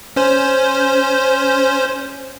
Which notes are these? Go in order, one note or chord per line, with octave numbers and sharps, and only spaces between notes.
C#4 C5